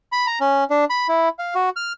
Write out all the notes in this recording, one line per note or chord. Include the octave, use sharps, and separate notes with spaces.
B5
A#5
C#4
D4
B5
E4
F5
F#4
F6